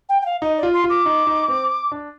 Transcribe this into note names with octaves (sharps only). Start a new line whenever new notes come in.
G5
G5
F5
D#4 D#5
D5
F4
C6
F4
D6
D#4
D#4
C4
D4